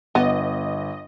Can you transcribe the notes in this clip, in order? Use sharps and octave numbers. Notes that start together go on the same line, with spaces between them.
G1 B3 D#5